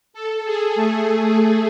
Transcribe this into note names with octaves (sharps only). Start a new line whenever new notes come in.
A4
G#4
A3